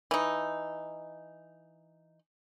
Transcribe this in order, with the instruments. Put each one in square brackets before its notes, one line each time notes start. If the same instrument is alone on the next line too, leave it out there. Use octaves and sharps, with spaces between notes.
[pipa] E3 D#4